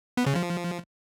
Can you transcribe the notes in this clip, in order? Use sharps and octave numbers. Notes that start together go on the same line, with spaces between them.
B3
C#3
F3